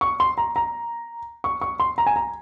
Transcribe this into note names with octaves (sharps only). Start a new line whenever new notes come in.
C#6
C6
A#5
A#5
C#6
C#6
C6
A#5
G#5
A#5